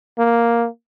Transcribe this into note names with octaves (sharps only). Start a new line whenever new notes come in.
A#3